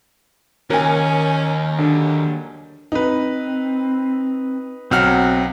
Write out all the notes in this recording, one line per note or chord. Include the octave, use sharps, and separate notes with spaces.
D#2 C#4 A#4 G#5
D3 F#3 G3
C4 D#4 B4
B1 F#3 C4 F#5 F6